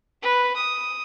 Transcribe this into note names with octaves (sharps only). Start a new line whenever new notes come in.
B4
D#6